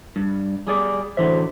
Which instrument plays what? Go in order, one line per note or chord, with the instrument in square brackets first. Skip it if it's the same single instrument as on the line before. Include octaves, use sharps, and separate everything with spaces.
[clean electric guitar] G2
G3 G#4 D5
[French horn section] A2 F#4 C5 [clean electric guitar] D3 E3 E5